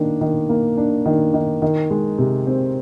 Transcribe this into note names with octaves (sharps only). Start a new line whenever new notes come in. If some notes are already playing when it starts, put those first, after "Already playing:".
Already playing: D#3 A#3 D4
D#3
A#3
D4
D#3
D#3
D#3
G#3
C3
C4